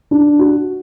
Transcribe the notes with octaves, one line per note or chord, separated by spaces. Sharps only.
D4
F#4